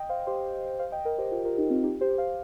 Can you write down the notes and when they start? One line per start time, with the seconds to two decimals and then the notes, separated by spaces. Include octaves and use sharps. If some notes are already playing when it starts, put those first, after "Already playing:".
Already playing: D#5 G5
0.09 C5 F5
0.27 G4 C5
0.79 C5 F5
0.92 D#5 G5
1.05 A#4 D#5
1.18 G4 C5
1.31 F4 A#4
1.45 F4 A#4
1.57 D#4 G4
1.70 C4 F4
1.83 D#4 G4
2.01 G4 C5
2.18 C5 F5